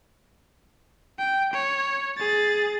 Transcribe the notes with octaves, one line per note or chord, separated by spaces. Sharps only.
G5
C#5
G#4 A6